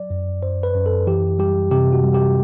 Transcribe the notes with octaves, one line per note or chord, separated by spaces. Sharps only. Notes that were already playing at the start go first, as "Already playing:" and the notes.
Already playing: F#3 D5
F#2
F#2 C5
B4
F#2
A4
E3 G4
G3 G4
C3 G4
F#4
G3
G4